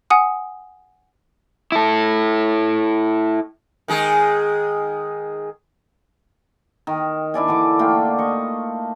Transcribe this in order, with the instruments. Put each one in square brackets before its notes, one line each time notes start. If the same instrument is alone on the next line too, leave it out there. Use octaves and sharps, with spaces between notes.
[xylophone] F#5 G#5 D#6
[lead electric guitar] E4 A4
[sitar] D#3 G#3 G#4
[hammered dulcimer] D#3
D4 E4 D5 G#5
D3 E3 D6
A3 A#3 F4 G5
D#5 C#6